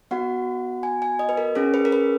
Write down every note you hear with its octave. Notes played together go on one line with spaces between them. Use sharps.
B3 F#4 F#5
G#5
G#5
D#5
B4
A#4
C#4 G#4 A#4
B4
A#4
B4